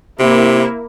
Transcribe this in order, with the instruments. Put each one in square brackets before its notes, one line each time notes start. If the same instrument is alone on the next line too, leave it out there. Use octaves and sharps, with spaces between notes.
[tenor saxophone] C3 [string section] A#3 E4